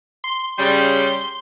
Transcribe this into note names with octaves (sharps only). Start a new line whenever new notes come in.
C6
C#3 G3 C6